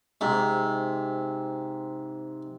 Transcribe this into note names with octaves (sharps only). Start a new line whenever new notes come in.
G#2 C3